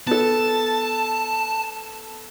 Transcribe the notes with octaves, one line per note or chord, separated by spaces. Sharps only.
B3 A4 A5